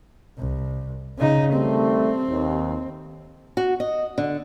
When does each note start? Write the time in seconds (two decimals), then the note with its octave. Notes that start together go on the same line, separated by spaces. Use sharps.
0.38 C2
1.18 C#3 D#4
1.52 D#3 G3 A3 C4
2.28 D#2
3.57 F#4
3.80 D#5
4.18 D3